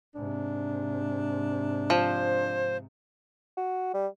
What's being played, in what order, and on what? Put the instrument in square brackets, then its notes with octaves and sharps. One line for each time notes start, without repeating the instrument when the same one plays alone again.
[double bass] G#2 C3 [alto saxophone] D4
[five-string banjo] F3 [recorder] C5
[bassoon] F#4
G3